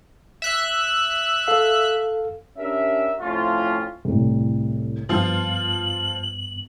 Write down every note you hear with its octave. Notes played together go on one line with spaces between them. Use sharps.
E5 F#6
A4 F5
C#4 D4 G4 A#4 E5
A2 F3 A3 C4 C#4 F4
C2 A2
G2 F3 B3 F4 F#7